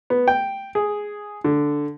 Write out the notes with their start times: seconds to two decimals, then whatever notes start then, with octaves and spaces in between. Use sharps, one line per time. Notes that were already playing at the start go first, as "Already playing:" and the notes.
0.10 B3
0.28 G5
0.75 G#4
1.44 D3